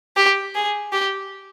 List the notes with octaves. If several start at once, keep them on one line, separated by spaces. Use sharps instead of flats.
G4
G#4
G4